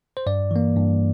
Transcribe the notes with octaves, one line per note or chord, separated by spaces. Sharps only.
C5
G2 D5
E3 A#3
G2